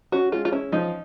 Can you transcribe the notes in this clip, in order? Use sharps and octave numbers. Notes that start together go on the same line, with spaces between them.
C#4 F#4
G#3 F4
F4
C#4 E4
F3 D#4